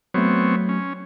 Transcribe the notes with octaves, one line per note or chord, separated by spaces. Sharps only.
F#3 A3 B3 C4 C#5
C#4